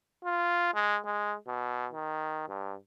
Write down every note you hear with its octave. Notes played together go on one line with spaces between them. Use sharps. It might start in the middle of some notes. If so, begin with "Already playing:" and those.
F4
G#3
G#3
B2
D#3
G2